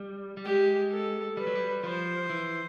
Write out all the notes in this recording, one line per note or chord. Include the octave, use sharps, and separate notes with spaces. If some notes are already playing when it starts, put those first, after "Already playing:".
Already playing: G3
G3
G#3 G4
A4
G3 B4
F#3
G3
F3 C5
E3